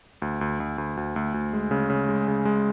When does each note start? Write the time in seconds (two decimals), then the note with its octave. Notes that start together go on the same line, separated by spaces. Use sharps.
0.22 D2
0.41 D2
0.60 D2
0.78 D2
0.97 D2
1.16 D2
1.34 D2
1.53 G#3
1.71 C#3
1.90 C#3
2.09 G#3
2.28 C#3
2.45 G#3